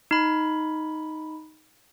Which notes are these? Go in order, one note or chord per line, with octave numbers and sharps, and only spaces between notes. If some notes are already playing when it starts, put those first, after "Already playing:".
D#4 B5